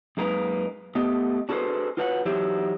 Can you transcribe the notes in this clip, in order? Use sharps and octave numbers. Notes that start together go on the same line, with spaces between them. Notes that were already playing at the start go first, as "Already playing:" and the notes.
F#2 G#3 A#3 D#4 B4 A#5
A3 B3 G4 D#5
D4 F#4 G#4 A4 B4 C5
F4 F#4 B4 C#5 F5 F#5
E3 F#3 D#4 G4 C5 E5